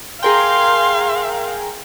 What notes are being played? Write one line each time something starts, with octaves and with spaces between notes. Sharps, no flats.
G#4 A#4 F5 G5 C6